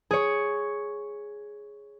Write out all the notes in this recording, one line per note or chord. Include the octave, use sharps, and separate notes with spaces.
G#4 C#5